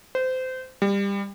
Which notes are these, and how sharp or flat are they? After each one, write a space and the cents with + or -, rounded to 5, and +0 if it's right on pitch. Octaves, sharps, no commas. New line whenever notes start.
C5 -25
G3 +25